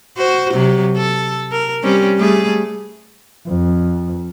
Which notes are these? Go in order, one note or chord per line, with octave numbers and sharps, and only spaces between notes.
F#4 C5
C3 F#3
A4
A#4
G3 C4 C#4
G3 A3 G#4
F2